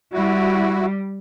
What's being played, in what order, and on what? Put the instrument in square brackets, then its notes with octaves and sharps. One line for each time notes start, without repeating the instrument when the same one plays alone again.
[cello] G3 [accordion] E4 F#4